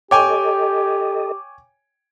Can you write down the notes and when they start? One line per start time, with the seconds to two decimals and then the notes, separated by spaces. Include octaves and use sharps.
0.11 G4 A4 C#5 D#5 G5 G#5 D6